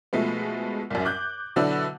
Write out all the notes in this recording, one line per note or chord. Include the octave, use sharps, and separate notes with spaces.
B2 F3 G#3 A3 B3
C2 F#2
D6 F#6 G6
B2 D3 F#3 B3 D4 E4